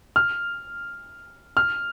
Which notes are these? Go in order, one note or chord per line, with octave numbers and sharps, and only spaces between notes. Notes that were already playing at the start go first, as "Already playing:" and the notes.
F6
F6